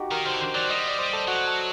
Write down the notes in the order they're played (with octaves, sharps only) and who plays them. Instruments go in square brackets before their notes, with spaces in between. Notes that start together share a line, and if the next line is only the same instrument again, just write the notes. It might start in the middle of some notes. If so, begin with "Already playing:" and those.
Already playing: [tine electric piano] D#4 F#4 G4
[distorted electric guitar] D#3 [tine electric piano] A#4
[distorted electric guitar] D3 [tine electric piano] C5
[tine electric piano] C5
[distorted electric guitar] F#3 [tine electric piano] D5
[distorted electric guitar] G3 [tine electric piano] D#5
[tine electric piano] D5
C5
A4
[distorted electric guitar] F#3 [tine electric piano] F#4
[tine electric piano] A4